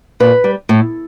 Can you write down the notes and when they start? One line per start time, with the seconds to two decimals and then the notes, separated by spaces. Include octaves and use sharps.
0.20 A#2 B4
0.44 G3
0.69 A2